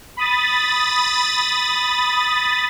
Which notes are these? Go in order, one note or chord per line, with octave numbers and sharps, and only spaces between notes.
B5 D#6 A6